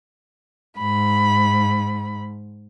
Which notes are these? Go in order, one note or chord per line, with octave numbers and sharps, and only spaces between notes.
G#2 B5